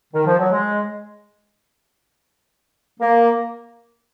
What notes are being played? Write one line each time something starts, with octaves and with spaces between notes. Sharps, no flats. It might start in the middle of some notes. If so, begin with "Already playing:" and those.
D#3
F3
F#3
G#3
A#3